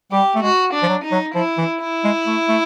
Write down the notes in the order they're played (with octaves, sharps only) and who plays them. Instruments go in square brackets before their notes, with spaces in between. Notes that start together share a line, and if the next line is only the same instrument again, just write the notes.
[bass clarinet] G3 [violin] G4
[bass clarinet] A3
[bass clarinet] G#3 [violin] F#4
[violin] D4
[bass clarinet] F3
F#3
[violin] D#4
[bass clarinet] F#3
[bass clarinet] F3 [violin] E4
[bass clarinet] E3
[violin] E4
[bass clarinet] G#3
A3
A3